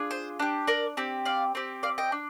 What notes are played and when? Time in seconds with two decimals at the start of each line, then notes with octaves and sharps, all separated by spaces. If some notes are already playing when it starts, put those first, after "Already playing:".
Already playing: D4 F4 G#4
0.11 C5
0.39 D4 G4
0.67 A#4 D5
0.97 C4 G4
1.25 D5 F5
1.55 C4 G4
1.83 D5 F5
1.98 D#5 G5
2.12 D4